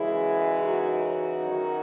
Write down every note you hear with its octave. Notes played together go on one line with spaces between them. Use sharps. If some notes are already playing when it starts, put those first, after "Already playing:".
Already playing: F#2 C#3 E3 G#3 E4 G#4
D#4 F#4
F#2 D#3 F#3